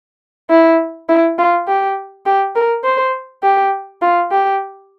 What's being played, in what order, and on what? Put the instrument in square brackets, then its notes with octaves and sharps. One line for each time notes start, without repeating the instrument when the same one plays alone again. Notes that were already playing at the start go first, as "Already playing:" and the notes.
[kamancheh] E4
E4
F4
G4
G4
A#4
C5
G4
F4
G4